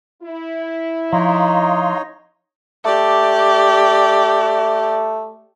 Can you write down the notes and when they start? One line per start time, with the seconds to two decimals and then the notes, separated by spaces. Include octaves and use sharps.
0.23 E4
1.13 F3 D#4 C#5 D#5 F5 A#5 C6
2.85 A3 G4 D5